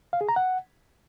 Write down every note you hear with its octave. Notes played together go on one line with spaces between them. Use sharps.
F5
G#4
A#5
F#5